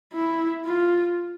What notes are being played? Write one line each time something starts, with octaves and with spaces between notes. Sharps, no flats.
E4
F4